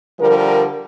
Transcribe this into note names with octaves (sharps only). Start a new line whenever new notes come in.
D3 F3 G3 A#4